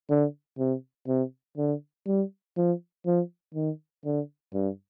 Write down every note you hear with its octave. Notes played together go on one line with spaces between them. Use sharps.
D3
C3
C3
D3
G3
F3
F3
D#3
D3
G2